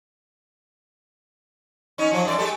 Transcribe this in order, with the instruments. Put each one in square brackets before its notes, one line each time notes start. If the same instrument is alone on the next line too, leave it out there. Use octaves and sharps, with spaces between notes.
[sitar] C#4 D#4
F3 F#3
F#2 D5
G#3 G4 A4